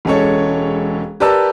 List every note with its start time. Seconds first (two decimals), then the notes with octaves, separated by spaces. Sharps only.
0.05 E1 G#3 C#4 A4 C#5
1.20 G4 A#4 B4 D5 A5 E6